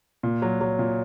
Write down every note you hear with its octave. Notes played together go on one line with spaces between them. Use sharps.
A#2
F#3
F#3
A#2